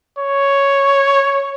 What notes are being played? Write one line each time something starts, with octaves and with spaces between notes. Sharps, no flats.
C#5